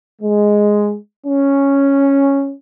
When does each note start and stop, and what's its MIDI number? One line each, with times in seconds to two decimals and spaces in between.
0.22 0.96 56
1.27 2.53 61